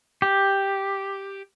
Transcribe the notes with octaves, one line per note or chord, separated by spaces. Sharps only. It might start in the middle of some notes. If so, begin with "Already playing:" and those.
G4